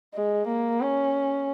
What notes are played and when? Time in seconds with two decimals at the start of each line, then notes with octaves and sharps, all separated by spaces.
0.14 G#3
0.47 A#3
0.81 C#4